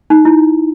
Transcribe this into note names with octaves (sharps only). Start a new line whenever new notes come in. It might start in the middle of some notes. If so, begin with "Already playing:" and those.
D#4
E4